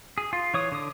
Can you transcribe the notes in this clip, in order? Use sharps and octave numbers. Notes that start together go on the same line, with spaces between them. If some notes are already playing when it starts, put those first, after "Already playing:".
G#4
F4
E3 C#5 D#6
D3 D#6